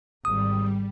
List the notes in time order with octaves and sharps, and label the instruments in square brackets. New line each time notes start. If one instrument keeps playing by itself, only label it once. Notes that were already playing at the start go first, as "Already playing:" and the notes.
[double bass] G#1 [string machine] G3 [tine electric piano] D#6